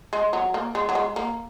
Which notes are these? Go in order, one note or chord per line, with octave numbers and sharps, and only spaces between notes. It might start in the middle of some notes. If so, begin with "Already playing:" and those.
G#3
F#3
A#3
G#3
F#3
G#3
A#3